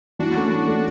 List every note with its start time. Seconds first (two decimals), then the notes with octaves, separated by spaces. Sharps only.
0.19 E3 D4 F#4
0.35 A3 C#4
0.51 E3
0.68 A3 C#4